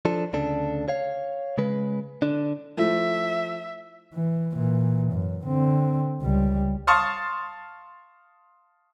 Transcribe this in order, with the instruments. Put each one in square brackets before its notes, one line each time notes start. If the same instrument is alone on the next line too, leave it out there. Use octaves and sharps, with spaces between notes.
[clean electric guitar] F3 D4 A4
D2 C#3 D4 A4
C#5 F5
C#3 G#3 B4
D3 D4
[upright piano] F3 A3 E4 [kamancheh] E5
[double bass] E3
A#2 E3
F#2
D3 C4
C#2 G3
[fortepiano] F5 A5 C6 C#6 D#6 F6